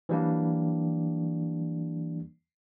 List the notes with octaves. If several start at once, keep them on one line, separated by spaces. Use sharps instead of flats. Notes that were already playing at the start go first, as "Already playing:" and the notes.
E3 F#3 G3 A#3 D4